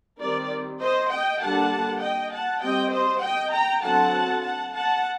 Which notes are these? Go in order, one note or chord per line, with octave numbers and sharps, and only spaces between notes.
D#3 G3 C4 A#4 D5
C5 D#5
D#5 G5
D3 G3 A#3 D4 F#5 A5
D#5 G5
F#5 A5
G3 C4 D#5 G5
C5 D#5
D#5 G5
G5 A#5
D3 F#3 C4 F#5 A5
F#5 A5
F#5 A5